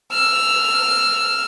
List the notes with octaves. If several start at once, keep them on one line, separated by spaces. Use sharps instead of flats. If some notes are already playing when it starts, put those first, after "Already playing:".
E6 F6